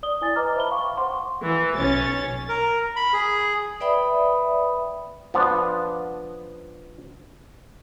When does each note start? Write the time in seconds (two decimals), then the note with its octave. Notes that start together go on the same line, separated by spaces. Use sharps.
0.03 D5 D#6 G7
0.21 E4 D5 G#5 D#6 A6
0.36 B4 D#5 A#5 D6 F6
0.56 C5 E5 A5 B5 G7
0.71 F5 G5 C#6 D6
0.97 C5 F5 F#5 C6 D6
1.41 E3
1.75 B1 C#4 A6
2.48 A#4
2.96 B5
3.13 G#4
3.80 B4 D5 E5 G5 B5 D#6
5.34 F3 B3 D4 F4